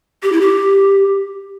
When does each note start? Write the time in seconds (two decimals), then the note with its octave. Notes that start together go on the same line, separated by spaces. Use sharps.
0.23 G4
0.32 E4
0.41 G4